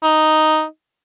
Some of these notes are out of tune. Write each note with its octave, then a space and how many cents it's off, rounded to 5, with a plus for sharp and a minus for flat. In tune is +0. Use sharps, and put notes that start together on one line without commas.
D#4 +0